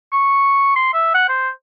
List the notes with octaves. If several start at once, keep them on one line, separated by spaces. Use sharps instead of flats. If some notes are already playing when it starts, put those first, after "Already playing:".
C#6
C6
E5
F#5
C5